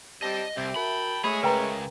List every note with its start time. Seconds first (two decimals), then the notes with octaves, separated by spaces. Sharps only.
0.23 G3 C4 D#5 A5
0.57 C2 C4 G4 E5
0.76 F#4 A#4 G5 A5 B5
1.24 G#3 A3 G#4 C#5 E5 B5 G#6 B6
1.43 C#2 C#3 A#4 B4 G5 A#5